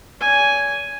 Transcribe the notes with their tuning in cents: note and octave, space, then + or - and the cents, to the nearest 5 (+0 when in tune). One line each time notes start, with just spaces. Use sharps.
D5 -45 G#5 +0